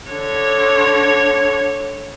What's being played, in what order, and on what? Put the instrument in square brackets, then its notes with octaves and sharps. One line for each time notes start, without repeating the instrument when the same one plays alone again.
[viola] D3 C#5